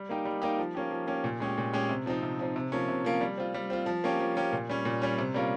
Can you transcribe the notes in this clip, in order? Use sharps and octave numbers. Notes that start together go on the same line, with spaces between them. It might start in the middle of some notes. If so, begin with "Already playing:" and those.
Already playing: G3
A#3 D#4 G4
G3
A#3 D#4 G4
F3
A#3 C#4 G4
F3
A#3 C#4 G4
A#2
G#3 C#4 G4
A#2
G#3 C#4 G4
C3
F3 C4 D#4
C3
F3 C4 D#4
C3
F3 A#3 C#4
C3
F3 A#3 C#4
G3
C4 F4
G3
C4 F4
F3
A#3 C#4 G4
F3
A#3 C#4 G4
A#2
G3 C#4
A#2
G3 C#4
C3
G3 A#3 C#4 F4